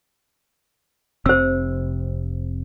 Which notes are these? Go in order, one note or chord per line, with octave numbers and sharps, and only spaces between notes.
F1 C3 C4 C5 E6